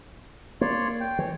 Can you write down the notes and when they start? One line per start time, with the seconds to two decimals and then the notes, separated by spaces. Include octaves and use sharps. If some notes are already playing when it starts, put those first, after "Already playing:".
0.61 A#3 C#5 D5 C6
1.01 G5
1.19 E3 C#5